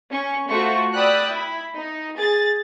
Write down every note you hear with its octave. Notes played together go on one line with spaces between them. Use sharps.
C#4 C#6
A3 F4 F#4 C5 C#6
D5 G5 B5 D#6 E6 F#6
E4 B5
D#4
G#4 A6